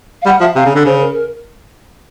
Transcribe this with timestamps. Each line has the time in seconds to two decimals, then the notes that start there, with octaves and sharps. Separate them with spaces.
0.22 F5
0.26 G3 F#5
0.40 F3 E5
0.55 C3 F5
0.65 C#3
0.75 D3
0.85 C#3 C5
1.00 A#4
1.14 A#4